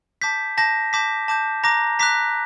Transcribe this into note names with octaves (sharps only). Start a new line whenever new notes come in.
A5 D6 G6 B6
A5 D6 G6 A#6
A5 D6 G6 B6
A5 D6 G6
A#5 D6 F#6 A#6
A#5 D6 F#6 B6